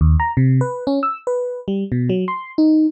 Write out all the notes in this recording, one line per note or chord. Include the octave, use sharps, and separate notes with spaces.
D#2
A#5
C3
B4
C#4
E6
B4
G3
B2
F#3
C6
D#4